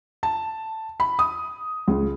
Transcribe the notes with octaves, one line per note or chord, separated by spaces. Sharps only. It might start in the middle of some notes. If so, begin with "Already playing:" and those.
A5
B5
D#6
C#2